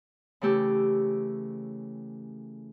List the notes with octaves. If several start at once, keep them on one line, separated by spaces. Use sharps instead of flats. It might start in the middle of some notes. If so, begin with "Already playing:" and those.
C#3 E3 A3 G4 E6